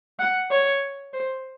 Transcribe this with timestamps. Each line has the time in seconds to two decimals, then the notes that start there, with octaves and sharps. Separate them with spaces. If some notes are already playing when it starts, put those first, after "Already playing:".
0.19 F#5
0.51 C#5
1.13 C5